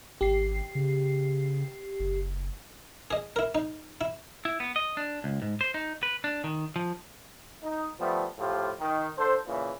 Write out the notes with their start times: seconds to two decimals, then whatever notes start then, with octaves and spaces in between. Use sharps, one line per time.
0.21 G#1 G4 C7
0.75 C#3
2.00 F#1
3.11 G#4 D#5
3.36 E4 A#4
3.55 D#4
4.01 E4
4.45 E4
4.60 B3
4.76 D#5
4.97 D4
5.24 C#2
5.42 G#2
5.61 C5
5.74 D#4
6.03 B4
6.24 D4
6.44 D#3
6.76 F3
7.63 D#4
7.99 F3 G3 A3 B3
8.38 A2 F3 F4 G4
8.80 D#3
9.17 D3 A4 C5
9.46 A#2 C#3 E3